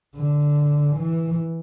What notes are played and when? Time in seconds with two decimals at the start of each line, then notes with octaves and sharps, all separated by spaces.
0.15 D3
0.96 E3